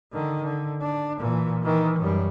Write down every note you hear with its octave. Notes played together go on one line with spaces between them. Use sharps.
D3 D#3
D3
D4
A#2 E3
D#3 E3
F#2 G3